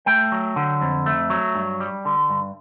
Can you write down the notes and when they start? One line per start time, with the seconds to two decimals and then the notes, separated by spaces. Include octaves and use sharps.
0.06 A3 G5
0.32 F#3
0.56 D3
0.81 F2
1.06 A3
1.30 F#3
1.55 G2
1.80 G3
2.05 D3
2.30 G2